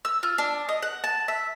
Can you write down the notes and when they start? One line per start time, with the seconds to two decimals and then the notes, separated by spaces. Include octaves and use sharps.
0.05 E6
0.23 F4
0.38 D4
0.69 D#5
0.82 F#5
1.04 A5
1.28 E5